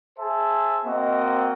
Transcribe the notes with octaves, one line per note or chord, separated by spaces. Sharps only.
G#4 C5 E5 A5
A#3 C4 F#4 D#5